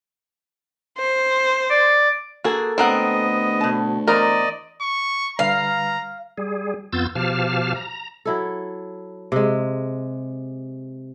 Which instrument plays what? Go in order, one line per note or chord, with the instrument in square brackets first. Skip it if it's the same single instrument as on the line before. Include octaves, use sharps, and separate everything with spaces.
[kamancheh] C5
[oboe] D5
[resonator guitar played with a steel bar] A#3 A4 [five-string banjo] F#4 G#4
[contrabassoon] D2 [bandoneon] B3 D#5 [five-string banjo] C4 A#4 F#5
[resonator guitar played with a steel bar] B2 A5
[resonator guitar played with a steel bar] E2 C5 A#5 [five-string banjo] A#4 [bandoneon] D5 D#5
[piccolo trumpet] C#6
[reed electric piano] D3 G3 B4 [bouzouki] F5 [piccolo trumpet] A#5
[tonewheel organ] G3 G#4
F2 B3 F4 E6 G6 A6
B2 F3 G4 F5 A5 F6
A#5
[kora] F#3 E4 A4
C3 G#3